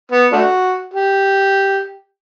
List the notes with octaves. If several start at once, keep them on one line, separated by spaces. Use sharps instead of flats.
B3
A3 D4 F#4
G4